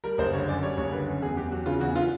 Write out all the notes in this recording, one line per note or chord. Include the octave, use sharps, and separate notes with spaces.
G3 A#4
F#1 C5
D3 C#5
F#2 D5
G3 C#5
F#1 C#5
D3 B4
F#2
E2 G#4
E2 G4
F#3 F#4
C#3 F4
E2 F#4
F4